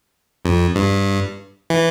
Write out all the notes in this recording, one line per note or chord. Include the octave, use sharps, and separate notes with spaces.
F2
G2
E3